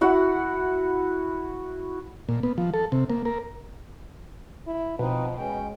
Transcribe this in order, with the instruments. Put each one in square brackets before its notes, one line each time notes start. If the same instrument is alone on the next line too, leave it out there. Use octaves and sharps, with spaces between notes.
[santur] E4 F#4 F#5
[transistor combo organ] A#2
B3
F3
A4
C3
A#3
A#4
[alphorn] E4
[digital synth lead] B2 [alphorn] F3 [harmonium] C4 D#4 B4
[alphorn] G#3 [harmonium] C#4 G5